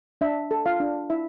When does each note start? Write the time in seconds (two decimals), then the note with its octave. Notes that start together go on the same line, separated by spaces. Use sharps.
0.21 D4 E5
0.51 A4
0.66 F4 F5
0.80 D4
1.10 E4 E5